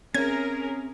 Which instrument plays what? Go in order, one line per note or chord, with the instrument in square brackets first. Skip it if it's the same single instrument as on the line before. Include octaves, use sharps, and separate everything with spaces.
[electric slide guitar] C4 C#5 E5 [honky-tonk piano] C#4 [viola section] G#4 A#4 [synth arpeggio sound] G#6